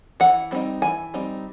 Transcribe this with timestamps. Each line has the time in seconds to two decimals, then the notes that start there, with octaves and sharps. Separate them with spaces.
0.20 E3 F#5
0.51 G3 C4 D#4
0.82 E3 G#5
1.14 G3 C4 D#4